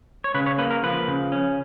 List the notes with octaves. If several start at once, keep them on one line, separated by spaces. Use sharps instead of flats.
C#5
C#3 B4
C#5
A#3 B4
A#4
F3 B4
C#3
C#4